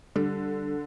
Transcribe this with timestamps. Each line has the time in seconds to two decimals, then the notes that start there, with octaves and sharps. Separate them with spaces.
0.16 D3 G3